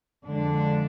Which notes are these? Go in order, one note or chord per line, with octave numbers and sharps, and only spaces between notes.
F2 D3 G#3 D4